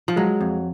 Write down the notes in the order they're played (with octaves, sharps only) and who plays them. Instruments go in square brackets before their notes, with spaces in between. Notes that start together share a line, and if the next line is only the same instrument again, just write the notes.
[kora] F3
[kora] F#3 [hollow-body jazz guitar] G#3
[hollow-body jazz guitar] F2